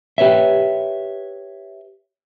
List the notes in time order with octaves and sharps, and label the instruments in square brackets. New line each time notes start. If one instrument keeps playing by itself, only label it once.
[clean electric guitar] G4 B4 C#5 E5